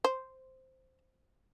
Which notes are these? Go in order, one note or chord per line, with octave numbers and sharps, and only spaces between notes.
C5